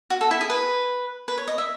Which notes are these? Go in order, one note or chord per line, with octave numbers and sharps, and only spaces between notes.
F#4
A4
E4
G#4
B4
B4
C#5
D#5
E5